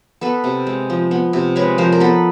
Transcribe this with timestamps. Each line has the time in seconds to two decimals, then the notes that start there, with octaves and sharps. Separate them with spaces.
0.21 B3 A4 B4
0.44 C3
0.67 G#3
0.90 F3
1.11 B3
1.33 C3
1.56 G#3 B4 C#5
1.78 F3 A#4 C5
1.92 A#4
2.00 B3 A4 B4